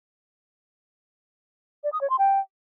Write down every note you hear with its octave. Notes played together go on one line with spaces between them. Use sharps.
D5
D#6
C#5
C6
G5